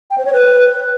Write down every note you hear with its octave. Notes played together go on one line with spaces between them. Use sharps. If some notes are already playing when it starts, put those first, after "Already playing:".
G5
C5
C#5
B4